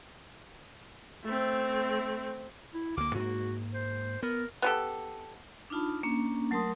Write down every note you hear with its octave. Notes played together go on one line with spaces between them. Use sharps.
A3 C4
E4
D2 A#3 D6
G#2 A#3 F#4
C5
B3 A#4
B3 G4 A4
D4 D#4 F4 A5 B5
A#3 C#4 D4
F#3 A3 A#4 A5 C6 D#6